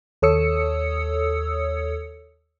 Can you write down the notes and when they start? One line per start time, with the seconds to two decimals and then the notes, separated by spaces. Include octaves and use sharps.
0.22 D#2 A4 C#5 D#6 E6 C#7